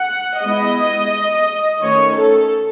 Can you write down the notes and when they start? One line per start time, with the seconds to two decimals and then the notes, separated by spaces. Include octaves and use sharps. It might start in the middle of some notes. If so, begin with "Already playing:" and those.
Already playing: F#5
0.42 G#3 B3 E4 D#5
1.82 D#3 A3 C#4 C#5
2.17 A4